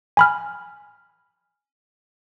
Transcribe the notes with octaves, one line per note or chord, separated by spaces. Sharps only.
G#5 B5 F6